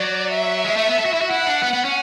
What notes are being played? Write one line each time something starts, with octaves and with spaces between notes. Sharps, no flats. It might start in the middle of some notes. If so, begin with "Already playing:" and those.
Already playing: F#3 D5
E5
G#3
A3
B3
A4
F#4
E4
F#4
E4 F#5
D4
B3
B3
C#4